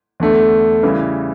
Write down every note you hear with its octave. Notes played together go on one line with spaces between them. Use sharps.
E2 D3 A3
C#3 E3 G3